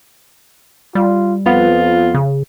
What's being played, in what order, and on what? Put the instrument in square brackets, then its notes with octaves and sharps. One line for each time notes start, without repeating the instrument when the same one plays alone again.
[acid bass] G3 [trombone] F4
[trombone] F2 [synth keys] B3 [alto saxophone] F4
[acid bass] C#3